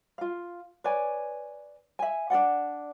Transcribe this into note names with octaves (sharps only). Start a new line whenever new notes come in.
F4 F5
B4 C#5 D5 G#5
E5 G#5
D4 A#4 D5 F#5